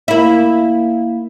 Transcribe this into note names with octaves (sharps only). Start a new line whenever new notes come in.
A#3 E4